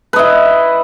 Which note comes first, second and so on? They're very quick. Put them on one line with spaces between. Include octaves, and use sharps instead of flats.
B4 D#5 E4